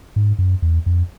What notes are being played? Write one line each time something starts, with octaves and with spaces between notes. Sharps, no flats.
G#2
F#2
E2
F2